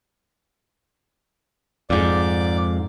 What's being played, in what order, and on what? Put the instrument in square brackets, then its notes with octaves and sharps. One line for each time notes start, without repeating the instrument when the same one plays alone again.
[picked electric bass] F2 G#2 [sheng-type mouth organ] D5